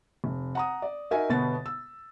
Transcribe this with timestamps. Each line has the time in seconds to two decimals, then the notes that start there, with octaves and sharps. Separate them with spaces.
0.24 F1
0.55 F#5 A#5 D#6
0.82 D5
1.11 D#4 F#4 A#4 E5 G#5
1.30 G1 B2 B3 A6
1.66 E6